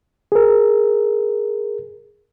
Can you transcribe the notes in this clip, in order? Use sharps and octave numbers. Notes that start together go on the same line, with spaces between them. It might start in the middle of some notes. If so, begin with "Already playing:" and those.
G#4 A#4